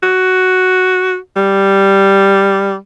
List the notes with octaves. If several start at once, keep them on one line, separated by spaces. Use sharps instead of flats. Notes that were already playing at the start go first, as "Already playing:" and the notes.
F#4
G3